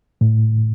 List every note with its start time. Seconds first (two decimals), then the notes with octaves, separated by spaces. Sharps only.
0.21 A2